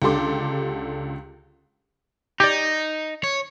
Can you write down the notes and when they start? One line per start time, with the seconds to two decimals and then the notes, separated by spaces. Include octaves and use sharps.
0.02 C#2 D3 G4 A4 C6 D6
2.40 D#4 G4 D5
3.24 C#5